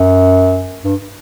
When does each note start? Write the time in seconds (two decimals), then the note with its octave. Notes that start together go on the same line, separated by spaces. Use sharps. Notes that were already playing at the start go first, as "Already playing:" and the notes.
Already playing: F#2
0.84 G2